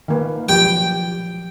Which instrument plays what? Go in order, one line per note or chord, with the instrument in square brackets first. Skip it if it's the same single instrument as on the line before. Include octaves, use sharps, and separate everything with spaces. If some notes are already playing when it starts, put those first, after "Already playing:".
[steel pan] D#3 A#3 B4
[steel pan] F3 F#3 G4 [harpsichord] G5